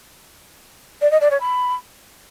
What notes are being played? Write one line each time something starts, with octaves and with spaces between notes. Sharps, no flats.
D5
D#5
D5
C#5
B5